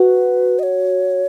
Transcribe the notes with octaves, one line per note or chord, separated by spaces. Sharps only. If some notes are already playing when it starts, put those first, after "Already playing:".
Already playing: F#4 B4
D#5
C#5